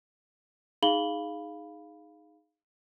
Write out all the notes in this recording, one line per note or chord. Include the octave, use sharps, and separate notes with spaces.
D#4 G#4 F5 B5 F#7 G7